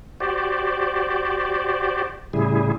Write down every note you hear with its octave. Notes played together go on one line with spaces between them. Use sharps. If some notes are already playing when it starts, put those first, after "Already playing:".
F#4 G4 C5 D5
A2 C#3 G3 E4 G#4